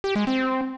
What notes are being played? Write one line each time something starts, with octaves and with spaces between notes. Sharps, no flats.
G4
G#3
C4